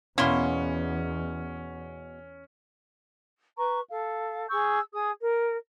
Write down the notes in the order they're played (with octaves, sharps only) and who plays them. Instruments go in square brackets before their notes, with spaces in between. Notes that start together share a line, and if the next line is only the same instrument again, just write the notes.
[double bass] E2 [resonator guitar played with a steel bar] B2 F#5 [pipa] A#3 E4 C6 [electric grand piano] C#4
[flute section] B4 A#5 C#6
A4 F5
G#4 C#6 E6 G6
G#4 D#6
A#4